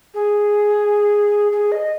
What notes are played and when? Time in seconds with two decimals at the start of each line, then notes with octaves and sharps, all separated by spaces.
0.14 G#4
1.52 G#4
1.72 D#5